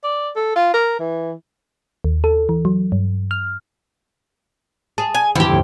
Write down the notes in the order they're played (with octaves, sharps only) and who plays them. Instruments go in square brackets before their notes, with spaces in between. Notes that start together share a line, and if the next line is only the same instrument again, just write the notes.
[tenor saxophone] D5
A4
F4
A#4
E3
[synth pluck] D#2
A4
E3
F#3
G2
F6
[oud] G#4 [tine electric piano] A5
[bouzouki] G#5
[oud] F2 G4 [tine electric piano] D#3 E3 [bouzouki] E4
[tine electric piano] D#2 G#2 D3